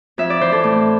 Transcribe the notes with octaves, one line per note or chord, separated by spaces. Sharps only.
F2 E5
D5
E3 C5
A4
A2